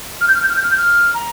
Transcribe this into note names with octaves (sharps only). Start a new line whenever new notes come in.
F6
G6
F6
G6
F6
G6
F6
G6
F6
A#5